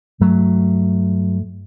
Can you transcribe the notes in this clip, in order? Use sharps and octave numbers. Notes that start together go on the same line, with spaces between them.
G2 F#3 A3